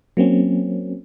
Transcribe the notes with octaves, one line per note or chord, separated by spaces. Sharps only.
F#3 A#3 C4 C#4